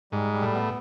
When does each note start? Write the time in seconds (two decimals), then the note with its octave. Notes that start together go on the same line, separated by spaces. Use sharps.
0.12 G#2 G3
0.33 G3
0.43 A2
0.53 B3